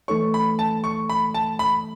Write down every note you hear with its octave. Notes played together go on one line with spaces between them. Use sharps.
E3 A3 D#4 A4 C#5 C#6
B5
A5
C#6
B5
A5
B5